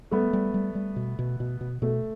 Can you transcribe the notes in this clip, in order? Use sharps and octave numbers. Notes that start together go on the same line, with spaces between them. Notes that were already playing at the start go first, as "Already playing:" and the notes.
G3 A3 B3
G3
G3
G3
B2
B2
B2
B2
B2 A3